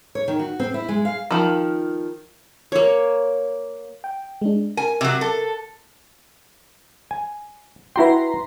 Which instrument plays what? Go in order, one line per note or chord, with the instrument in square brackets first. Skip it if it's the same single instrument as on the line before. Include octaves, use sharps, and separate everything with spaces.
[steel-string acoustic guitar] C#5
D#3
F#4
C4
E4
G#3
F5
[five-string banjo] D#3 F3
[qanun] A#3 C#5
[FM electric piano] G5
G#3 D4
[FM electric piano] A#4 [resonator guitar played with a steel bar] G#5
[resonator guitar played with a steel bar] C3 F#3
A4
[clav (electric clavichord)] G#5
[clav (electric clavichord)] E4 F#4 G5 [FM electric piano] B4 A#5 C6